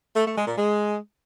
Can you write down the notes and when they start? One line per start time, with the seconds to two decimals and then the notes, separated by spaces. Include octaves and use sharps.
0.15 A3
0.26 A3
0.36 G#3
0.47 A#2
0.57 G#3